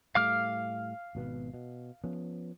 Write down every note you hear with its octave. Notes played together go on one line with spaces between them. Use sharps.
A2 G3 A3 F5 D6 F6
G#1 B2 B3
B2
F3 B3 C#4